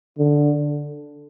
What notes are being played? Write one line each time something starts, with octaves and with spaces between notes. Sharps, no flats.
D3